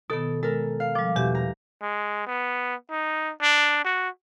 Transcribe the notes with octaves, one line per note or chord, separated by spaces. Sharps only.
B2 D#3 B3 A4
G#3 A4 A#4
F5
F3 G3 D6
E2 B2 G4 E5
A#5
G#3
B3
D#4
D4
F#4